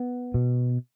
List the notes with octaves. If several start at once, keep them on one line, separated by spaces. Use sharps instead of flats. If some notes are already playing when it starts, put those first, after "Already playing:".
Already playing: B3
B2